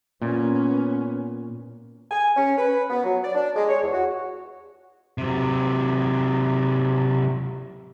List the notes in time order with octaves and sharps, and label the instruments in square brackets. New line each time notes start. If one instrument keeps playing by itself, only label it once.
[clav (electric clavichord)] A#2 [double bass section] B3 C#4
[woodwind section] G#5
C#4
B4
B3
F#3
D5
D4
G#3
C#5
E2
F#4
[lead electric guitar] C3 F#3